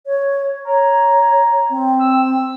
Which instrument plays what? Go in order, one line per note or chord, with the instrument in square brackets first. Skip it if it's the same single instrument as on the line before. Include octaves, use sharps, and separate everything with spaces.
[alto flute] C#5
[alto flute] C#5 [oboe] A#5
[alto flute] C4
[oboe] E6